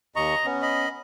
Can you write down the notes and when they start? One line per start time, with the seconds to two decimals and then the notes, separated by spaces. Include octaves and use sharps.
0.16 D#2 D#5 A#5 C#6
0.46 B3 C#4
0.62 D#5 B5